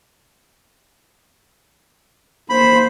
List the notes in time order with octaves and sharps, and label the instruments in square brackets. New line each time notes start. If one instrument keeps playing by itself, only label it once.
[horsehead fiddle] A#3 C5 [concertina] B5